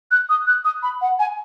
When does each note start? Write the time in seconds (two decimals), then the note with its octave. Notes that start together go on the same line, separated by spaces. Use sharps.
0.11 F#6
0.29 D#6
0.47 F#6
0.65 D#6
0.83 B5
1.02 F#5
1.19 G#5